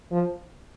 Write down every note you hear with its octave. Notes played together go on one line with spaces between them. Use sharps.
F3